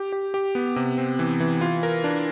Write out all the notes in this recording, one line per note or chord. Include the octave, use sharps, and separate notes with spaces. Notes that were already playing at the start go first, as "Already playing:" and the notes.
Already playing: G4
G4
G4
B3
C3
C4
E3
E3
F4
A#4
D4